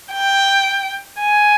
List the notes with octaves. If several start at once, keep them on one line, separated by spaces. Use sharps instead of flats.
G5
G#5